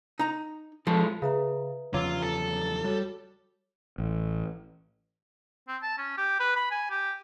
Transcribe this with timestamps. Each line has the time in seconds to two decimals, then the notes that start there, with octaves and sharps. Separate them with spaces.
0.19 D#4 A#5
0.87 F3 G#3 F4 A4
1.22 C#3 B4 E5 A#5
1.94 E2 C#3 F3 F#3 F4 D6 E6
2.22 A4
2.84 G3 F#4 C#5
3.98 A1
5.68 C4
5.83 A5
5.98 C#4
6.17 G4
6.40 B4
6.56 B5
6.71 G#5
6.91 G4